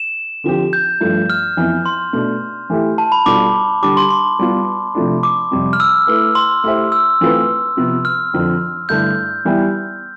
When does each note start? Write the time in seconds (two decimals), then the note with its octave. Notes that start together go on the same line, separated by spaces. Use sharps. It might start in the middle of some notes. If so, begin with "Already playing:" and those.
Already playing: E7
0.44 D3 F3 C4 G4
0.73 G6
1.01 G2 F3 A3
1.30 F6
1.57 F2 E3 B3 E4
1.86 C6
2.13 B2 A3 D4
2.70 E3 A3 E4 G4
2.98 A5
3.12 B5
3.26 B2 G3 D4 F4 A4 D6
3.82 D3 G3 D4 G4 D6
3.97 C6
4.10 C6
4.39 G3 B3 F4
4.95 C3 F3 A3 D4
5.23 D6
5.51 F2 C3 G3
5.73 F6
5.80 E6
6.07 A3 E4 B4
6.35 C6
6.64 A3 E4 G4 C5 E5
6.92 E6
7.21 E3 A3 C4 F4 B4
7.77 C3 F3 B3
8.05 F6
8.34 F2 D3 F3 C4
8.89 G2 D3 A3 E4 A4 G6
9.45 E3 G3 B3 E4 G4